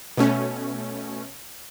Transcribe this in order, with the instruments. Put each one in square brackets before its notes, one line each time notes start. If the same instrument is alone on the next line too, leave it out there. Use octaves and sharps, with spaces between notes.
[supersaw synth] B2 A3 C#4